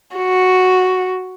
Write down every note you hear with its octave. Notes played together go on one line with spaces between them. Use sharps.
F#4